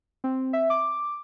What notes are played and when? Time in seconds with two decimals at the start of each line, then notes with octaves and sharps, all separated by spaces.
0.24 C4
0.53 E5
0.70 D6